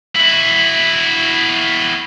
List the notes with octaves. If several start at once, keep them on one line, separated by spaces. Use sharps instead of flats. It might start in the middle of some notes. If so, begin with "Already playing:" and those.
E4 F#4